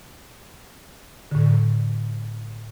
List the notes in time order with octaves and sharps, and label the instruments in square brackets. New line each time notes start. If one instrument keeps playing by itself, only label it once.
[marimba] A2 D3